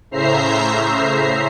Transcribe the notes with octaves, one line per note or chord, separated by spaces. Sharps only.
A2 C#3 C5 E5 A#5 C7